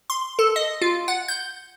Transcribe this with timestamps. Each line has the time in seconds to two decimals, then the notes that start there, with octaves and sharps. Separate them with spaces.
0.10 C6
0.39 A4
0.56 D#5
0.82 F4
1.08 F#5
1.28 G6